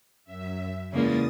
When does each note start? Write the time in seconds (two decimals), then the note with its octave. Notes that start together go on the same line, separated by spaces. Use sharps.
0.24 F#2 E5
0.92 E2 C#3 G#3 A#3 C#4 D#6 A6